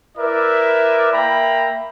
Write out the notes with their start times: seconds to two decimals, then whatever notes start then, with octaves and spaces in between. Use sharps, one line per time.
0.17 E4 A#4 B4 D5 E5
1.12 A#3 E5 G5 A#5 B5